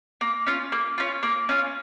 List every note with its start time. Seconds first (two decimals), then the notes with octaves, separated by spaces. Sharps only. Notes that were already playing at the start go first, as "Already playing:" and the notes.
0.21 A#3
0.47 C#4 F4
0.72 A#3
0.98 C#4 F4
1.23 A#3
1.49 C#4 F4